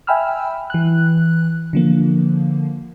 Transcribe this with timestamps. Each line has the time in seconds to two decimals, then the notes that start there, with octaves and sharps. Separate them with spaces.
0.07 E5 G5 G#5 B5 E6 F6
0.70 E3 F#6
1.73 D3 F3 A#3